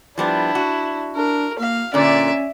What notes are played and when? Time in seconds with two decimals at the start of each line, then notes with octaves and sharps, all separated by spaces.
0.18 F3 G3 B3 D4 E4
0.55 F#4
1.16 D4 A#4
1.59 A#3 F5
1.94 A#2 D3 C#4 D5 E5